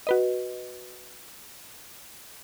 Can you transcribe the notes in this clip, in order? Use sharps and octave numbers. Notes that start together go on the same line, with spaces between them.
F#4 B4 D#5